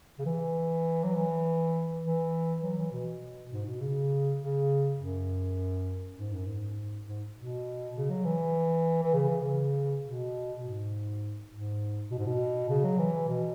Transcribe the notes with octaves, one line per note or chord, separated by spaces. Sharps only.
C#3
E3
F#3
E3
E3
F#3
E3
B2
G#2
B2
C#3
C#3
F#2
G#2
F#2
G#2
G#2
B2
C#3
F#3
E3
E3
C#3
E3
C#3
B2
G#2
G#2
B2
G#2
B2
C#3
F#3
E3
B2